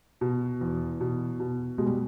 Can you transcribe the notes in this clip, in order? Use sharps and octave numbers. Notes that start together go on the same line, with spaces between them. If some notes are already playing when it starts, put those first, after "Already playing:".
B2
E2
B2
B2
B2 G#3
G3